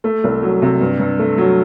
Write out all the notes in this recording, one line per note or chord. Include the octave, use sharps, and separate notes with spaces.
A3
C2
F#3
C3
G2
G2
A3
F#3